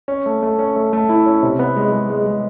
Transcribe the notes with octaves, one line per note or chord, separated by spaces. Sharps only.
C#4
A3
A3
C#4
A3
A3
E4
C#4
C3
B3
G#3
G#3
G#3
G#3